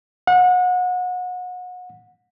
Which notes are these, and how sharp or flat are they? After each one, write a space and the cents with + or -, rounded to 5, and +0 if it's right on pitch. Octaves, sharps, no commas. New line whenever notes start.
F#5 -30